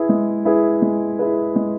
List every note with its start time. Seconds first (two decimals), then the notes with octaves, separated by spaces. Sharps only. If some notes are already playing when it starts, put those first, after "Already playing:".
Already playing: E4 G#4 B4
0.09 G#3
0.45 E4 G#4 B4
0.82 G#3
1.19 E4 G#4 B4
1.56 G#3